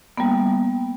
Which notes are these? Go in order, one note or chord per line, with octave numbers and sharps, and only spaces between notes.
G3 A#3 B3